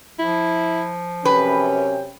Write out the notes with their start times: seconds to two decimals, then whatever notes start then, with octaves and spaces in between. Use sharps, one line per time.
0.19 F3 E4
1.25 F#2 C3 C#4 B4 G5